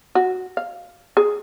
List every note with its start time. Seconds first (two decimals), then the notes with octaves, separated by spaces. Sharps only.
0.15 F#4
0.57 F5
1.17 G#4